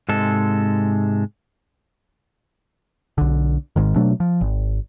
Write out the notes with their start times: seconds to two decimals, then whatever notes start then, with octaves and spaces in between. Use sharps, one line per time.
0.09 G#2 C3 G#3 A4
3.18 B1 D3
3.76 G#1 G#2 D#3
3.96 B2 F#3 A3 D4
4.20 F3
4.41 G#1